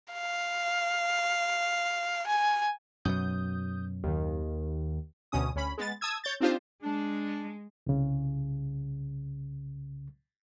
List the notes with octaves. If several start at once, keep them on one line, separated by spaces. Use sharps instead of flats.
F5
G#5
F#2 B2 F#3 D#6 G6
D#2 D#3
D2 B2 C#4 D#6
D2 C#4 B5
G#3 B3 A6
A5 D#6 E6 G#6
C#5 G6 A6
C4 D4 D#4 F4 G4 C5
G#3 D4
C2 C#3